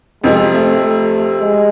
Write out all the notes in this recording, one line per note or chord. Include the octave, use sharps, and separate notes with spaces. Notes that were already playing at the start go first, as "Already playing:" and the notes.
F2 C3 F3 G#3
A3
A3
G#3